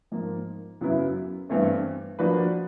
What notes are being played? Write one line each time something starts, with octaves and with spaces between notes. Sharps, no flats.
G#2 F3 A#3
F#2 C#3 F#3 B3 E4
G2 E3 A3 C4
F3 A#3 D4 F#4 B4